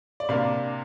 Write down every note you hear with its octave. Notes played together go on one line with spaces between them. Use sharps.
D5
C3 A#3 D4 F5